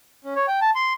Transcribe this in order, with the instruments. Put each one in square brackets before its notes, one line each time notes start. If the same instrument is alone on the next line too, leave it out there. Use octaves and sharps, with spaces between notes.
[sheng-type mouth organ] C#4
C#5
G5
A5
C6